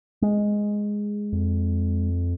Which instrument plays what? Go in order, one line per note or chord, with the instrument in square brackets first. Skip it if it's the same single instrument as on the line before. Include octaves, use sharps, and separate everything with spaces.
[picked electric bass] G#3
[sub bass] F2